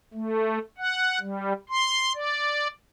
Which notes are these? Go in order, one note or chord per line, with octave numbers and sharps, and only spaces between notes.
A3
F#5
G3
C6
D5